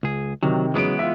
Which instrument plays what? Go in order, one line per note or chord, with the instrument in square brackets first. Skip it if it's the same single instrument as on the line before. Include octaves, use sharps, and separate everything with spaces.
[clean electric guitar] C#2 G#4
[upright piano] C3 D#3 [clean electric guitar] F#3
[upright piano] C#3 F#3 D7 [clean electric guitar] E3 G#3 B3
[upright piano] F4 E5